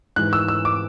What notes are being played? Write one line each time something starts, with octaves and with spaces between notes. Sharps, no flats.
G#2 E3 F#6
E6
E6
D6